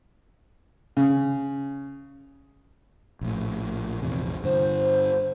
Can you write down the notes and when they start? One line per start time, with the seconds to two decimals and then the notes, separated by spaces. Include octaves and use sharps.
0.97 C#3
3.21 A#1 A2
4.02 A#1 E2 C3
4.44 G2 D3 C5